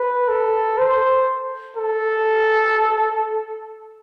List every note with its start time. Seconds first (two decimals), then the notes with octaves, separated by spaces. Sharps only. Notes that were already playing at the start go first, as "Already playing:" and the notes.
Already playing: B4
0.28 A4
0.78 C5
1.77 A4